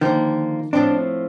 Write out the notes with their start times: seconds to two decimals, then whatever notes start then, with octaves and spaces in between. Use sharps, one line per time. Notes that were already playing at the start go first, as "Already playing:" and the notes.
0.01 D3 D#3 F3 A#3
0.73 A2 F3 C4 D4